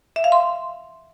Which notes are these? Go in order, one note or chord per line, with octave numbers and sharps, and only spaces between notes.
E5
F5
C6